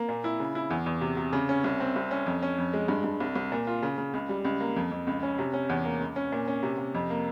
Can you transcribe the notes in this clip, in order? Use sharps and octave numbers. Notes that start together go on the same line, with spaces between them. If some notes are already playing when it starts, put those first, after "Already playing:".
Already playing: A#3
A#2
E4
C#3
E4
E2
E2
C3
C3
C#3
C#4
C2
C4
C2
C#4
F2
C#4
F2
G#3
G2
G2
C2
C2
A#2
F4
C#3
C#3
C#2
G3
C#2
A#3
F2
F2
C#2
C#4
C3
C#4
E2
A#3
C#2
C#4
A#2
C#4
C3
C3
F2
A#3